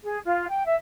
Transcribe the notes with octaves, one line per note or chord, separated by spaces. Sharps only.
G#4
F4
G5
E5